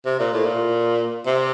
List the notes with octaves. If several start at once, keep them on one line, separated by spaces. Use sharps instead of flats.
C3
A#2
A2
A#2
C3